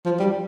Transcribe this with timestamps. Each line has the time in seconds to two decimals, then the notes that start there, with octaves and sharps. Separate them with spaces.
0.05 F3
0.20 G3